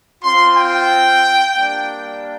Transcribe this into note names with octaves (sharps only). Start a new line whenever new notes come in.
C4 F4 C6
G5
G3 A#3 D4